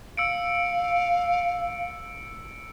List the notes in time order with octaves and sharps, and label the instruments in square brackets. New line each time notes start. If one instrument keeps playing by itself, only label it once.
[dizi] F5 [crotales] E6 C#7 D7